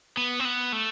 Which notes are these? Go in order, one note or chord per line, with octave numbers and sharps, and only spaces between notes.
B3
C4
B3
A3